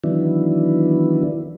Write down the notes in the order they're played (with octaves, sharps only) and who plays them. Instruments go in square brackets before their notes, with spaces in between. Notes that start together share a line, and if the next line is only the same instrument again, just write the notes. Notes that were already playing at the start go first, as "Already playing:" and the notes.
[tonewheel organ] D#3 E3 F#3 B3 D4 E4